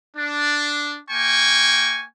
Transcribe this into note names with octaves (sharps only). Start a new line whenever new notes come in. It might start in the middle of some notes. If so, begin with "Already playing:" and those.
D4
A#3 G5 G#5 C#6